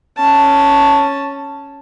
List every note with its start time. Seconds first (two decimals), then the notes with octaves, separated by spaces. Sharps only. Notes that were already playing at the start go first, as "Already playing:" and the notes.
0.17 C#4 A5